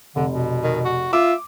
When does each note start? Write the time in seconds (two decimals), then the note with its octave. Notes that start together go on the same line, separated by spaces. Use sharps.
0.16 F1 D3
0.32 B2
0.63 D#3
0.85 F#4
1.13 F4 E5 D6